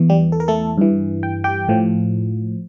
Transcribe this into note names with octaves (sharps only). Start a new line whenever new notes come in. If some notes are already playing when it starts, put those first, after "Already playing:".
Already playing: E2 E3
G3 G4
A4
A#4
A3 A4
G2 E3
G5
G4 G5
A2 F3